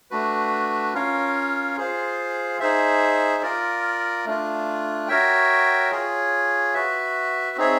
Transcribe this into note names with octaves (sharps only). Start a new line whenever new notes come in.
A3 D4 F#4 B4
C#4 F4 A#4 C#5 F5
F4 G#4 C5 F5
D#4 G#4 C5 E5
F4 A#4 D5
A3 D4 F4
F#4 A#4 C#5 E5 G5
F4 G#4 C#5
F#4 B4 E5
C4 D#4 G#4 C#5 E5